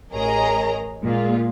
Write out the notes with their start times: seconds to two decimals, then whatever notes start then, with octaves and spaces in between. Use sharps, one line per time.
0.12 A1 G#4 A#4 C#5 D#5 A#5
1.03 A#2 G#3 A#3 F4